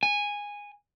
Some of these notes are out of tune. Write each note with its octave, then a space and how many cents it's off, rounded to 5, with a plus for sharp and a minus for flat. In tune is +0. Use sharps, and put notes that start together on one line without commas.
G#5 -10